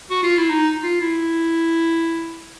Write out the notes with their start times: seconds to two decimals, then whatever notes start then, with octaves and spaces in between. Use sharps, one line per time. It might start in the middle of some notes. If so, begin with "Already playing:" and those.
0.10 F#4
0.23 F4
0.37 E4
0.50 D#4
0.83 F4
1.01 E4